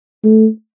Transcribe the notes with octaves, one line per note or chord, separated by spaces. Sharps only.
A3